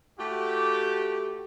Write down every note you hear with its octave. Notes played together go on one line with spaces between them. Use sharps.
A3 E4 F#4 G4